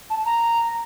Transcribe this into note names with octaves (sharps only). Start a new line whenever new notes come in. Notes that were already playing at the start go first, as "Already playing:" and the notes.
A5
A#5